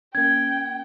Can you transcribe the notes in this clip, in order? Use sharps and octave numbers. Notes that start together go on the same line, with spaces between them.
A#3 C#4 G5 G#6